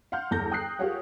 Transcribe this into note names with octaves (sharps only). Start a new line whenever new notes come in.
F5 F#5 C6 F6 G6
G1 E2 A4 G6 A#6
G5 D#6 F#6 C7
F4 G4 G#4 A#4 C#5 F#5